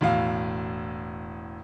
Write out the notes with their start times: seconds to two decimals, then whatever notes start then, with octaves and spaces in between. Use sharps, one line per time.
0.01 E1 A2 F5